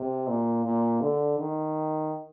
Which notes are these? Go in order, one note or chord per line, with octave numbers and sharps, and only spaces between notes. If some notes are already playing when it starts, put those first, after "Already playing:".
Already playing: C3
A#2
A#2
D3
D#3